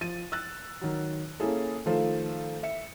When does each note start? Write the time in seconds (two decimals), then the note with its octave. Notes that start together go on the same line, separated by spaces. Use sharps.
0.01 F3 A6 D#7
0.32 E6 F#6 A6
0.81 D#3 F#3
1.40 A#3 C#4 E4 G#4 A4
1.86 D#3 F3 A3 F4 A4 C5
2.63 E5 C#7